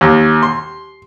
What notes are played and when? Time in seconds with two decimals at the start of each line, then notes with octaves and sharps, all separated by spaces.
0.01 D#2
0.43 C6